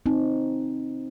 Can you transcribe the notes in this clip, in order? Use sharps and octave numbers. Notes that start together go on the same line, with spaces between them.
C4 D#4